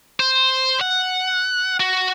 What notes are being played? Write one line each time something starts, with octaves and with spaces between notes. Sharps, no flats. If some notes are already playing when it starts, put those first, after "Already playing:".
C5
F#5
F#4